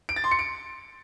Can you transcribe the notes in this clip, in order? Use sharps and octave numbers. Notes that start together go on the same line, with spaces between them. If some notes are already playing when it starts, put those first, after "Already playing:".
D7
A6
C6
C#7
D7